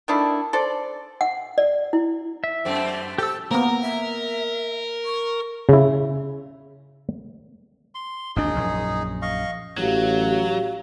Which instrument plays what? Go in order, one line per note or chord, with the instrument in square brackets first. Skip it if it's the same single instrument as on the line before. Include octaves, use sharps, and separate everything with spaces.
[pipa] D#3 A3 D4 E4
A4 C5 D5
[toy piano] F#5
D5
E4
[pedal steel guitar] E5
[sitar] F#2 A3 C4
[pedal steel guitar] G4 E6 [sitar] A4
[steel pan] A#3 B3 [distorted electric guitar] A#4 [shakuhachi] A#5
[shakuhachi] E5
C#6
[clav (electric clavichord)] C#3 E4
[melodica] C6
[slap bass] G#1 D#2 D4 [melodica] D#4 G#4
[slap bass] A#1 F#2
[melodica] D#5 F5 C#6
[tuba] A1 [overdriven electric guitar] F#3 [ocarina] F#4 [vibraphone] G4 F5